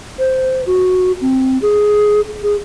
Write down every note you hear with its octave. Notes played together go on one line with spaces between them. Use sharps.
C5
F#4
C4
G#4
G#4